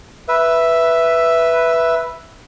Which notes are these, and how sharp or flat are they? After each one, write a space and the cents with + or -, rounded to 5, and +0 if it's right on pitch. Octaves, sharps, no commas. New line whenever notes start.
B4 +0 E5 +0